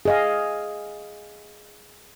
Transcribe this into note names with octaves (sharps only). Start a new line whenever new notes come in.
G#4 D#5 F5